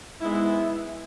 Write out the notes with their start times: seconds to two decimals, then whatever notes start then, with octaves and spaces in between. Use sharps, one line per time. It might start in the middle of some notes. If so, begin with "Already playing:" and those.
0.21 G#2 G#3 B3 E4